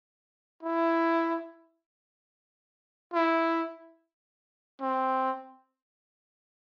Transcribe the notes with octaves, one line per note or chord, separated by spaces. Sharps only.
E4
E4
C4